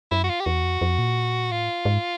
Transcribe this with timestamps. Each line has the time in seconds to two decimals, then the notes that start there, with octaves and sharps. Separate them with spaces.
0.11 F#2 E4
0.24 F#4
0.29 F4
0.40 G4
0.46 E2 F#4
0.63 F2
0.81 F2
0.99 A#2
1.51 A2 F4
1.85 G#2